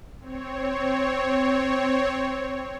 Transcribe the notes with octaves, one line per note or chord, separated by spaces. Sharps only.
C4 C#5